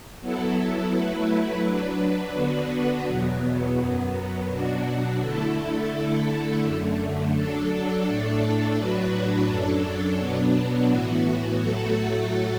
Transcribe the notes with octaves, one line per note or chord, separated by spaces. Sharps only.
F#3 B3 E4 A4
F#3 A3 E4 B4
F#3 D4 B4
D3 B3 D4 F#4 B4
E2 B2 F#3 B3
F#2 F#3 B3
B2 F#3 D4 F#4
D3 A3 E4 A4
D3 A3 E4 A4
F#2 D3 A3
F#3 D4 A4
A2 A3 D4 A4
A2 F#3 D4 F#4 B4
F#2 F#3 D4 A4
B2 F#3 B3 D4
A2 E3 B3 F#4
A2 F#3 A3 F#4 A4